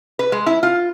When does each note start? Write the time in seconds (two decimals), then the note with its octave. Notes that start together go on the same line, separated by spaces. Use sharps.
0.19 B4
0.32 G#3
0.46 E4
0.63 F4